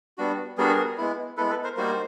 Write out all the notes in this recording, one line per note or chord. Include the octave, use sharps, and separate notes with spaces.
G3 B3 D4 F#4
G3 B3 D4 F#4 G#4 A#4
G#3 B3 E4
G#3 B3 E4 A4 B4
A4 B4
A#4 C5
G3 A#3 D#4 F#4 A#4 C5